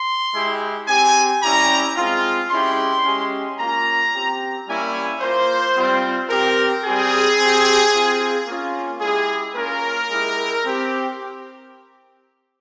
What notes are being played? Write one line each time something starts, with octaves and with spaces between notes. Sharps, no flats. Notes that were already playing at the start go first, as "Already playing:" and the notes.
Already playing: C6
G#3 E4 G4
C4 G4 G#5
G3 C#4 E4 G4 A#5
G#3 C4 F4
G#3 C#4 E4 G4 C6
G#3 C#4 G4
A#3 C#4 F4 A#5
C4 G4
G3 A#3 C#4 E4 G#5
A#3 F4 C5
G3 C4 F4
C4 G4 A#4
G3 C4 G4 G#4
C4 G4
C4 F4
A#3 C#4 F4
G#3 E4 G4 G#4
A#3 C#4 F4 A#4
G#3 E4 G4
C4 G4